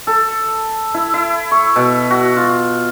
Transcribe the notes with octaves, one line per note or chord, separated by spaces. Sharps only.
A4
E4
E4
C#6
B2
F#4
F4